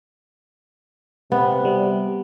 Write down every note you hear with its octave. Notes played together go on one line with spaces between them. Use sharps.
C3 B3
G3